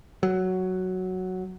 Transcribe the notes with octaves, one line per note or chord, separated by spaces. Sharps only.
F#3